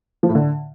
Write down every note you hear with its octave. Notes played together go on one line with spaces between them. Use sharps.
F3
A2
D3